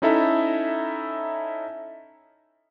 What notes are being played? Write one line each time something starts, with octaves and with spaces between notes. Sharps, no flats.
C#4 D#4 E4 A4 E5 A#5